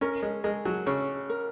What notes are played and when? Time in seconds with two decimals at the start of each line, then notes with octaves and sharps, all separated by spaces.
0.01 C#4 A#4
0.22 G#3
0.44 G#3 A#4
0.65 F#3
0.86 C#3 C#5
1.30 A#4